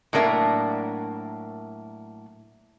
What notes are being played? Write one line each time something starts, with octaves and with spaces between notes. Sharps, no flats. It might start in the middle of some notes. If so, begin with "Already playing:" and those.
A2 F#3 A#3 D4 A#4 E5